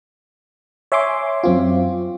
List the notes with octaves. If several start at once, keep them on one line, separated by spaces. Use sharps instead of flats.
C#5 E5 G#5 C6 D6
F#2 C4 F4